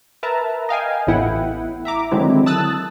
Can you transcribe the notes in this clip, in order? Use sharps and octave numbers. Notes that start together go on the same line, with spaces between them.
A#4 B4 E5 A5 A#5
D#5 F5 G5 G#5
A1 A2 B3 E4 F#5 G5
E5 A#5 D6
D3 D#3 F#3 G#3 C4 E4
A5 D#6 E6 F#6 A6